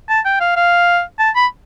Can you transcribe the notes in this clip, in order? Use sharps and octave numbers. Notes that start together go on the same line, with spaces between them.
A5
G5
F5
F5
A5
B5